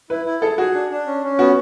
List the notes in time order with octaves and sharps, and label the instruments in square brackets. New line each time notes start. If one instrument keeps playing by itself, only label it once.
[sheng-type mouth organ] E4 [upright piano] B4
[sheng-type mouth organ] E4
[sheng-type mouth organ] G#4 [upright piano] A4
[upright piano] F#4 [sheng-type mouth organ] G#4
[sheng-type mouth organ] D4
D4
C#4
C#4
[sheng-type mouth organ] B3 [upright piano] F#4